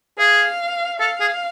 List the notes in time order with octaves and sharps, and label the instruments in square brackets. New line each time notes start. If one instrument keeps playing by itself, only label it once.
[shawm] G#4 [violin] F5
[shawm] A4 [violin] F5
[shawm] G#4